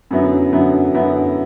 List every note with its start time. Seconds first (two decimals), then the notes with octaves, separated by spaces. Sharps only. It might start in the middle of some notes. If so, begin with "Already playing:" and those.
0.11 F#2 D3 F#3 B3 E4
0.52 F#2 D3 F#3 B3 E4
0.94 F#2 D3 F#3 B3 E4